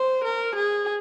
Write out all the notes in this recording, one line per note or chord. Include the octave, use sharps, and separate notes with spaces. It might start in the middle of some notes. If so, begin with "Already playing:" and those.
Already playing: C5
A#4
G#4